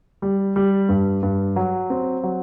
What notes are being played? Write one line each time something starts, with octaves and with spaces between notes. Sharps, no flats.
G3
G3
G2
G2
F#3
C4
F#3